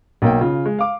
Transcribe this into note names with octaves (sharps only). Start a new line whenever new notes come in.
B1 A#3 G5
C#3 F4
G#3
F5 D6